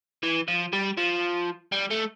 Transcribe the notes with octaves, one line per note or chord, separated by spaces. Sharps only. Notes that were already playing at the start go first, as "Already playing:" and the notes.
E3
F3
G3
F3
G3
A3